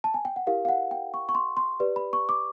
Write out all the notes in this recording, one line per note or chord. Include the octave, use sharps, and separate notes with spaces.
A5
G#5
G5
F#5
E4 G4 A#4 F5
F5
F#5
G5
C#6
C#6
C6
C6
G4 B4 D5
B5
C#6
D6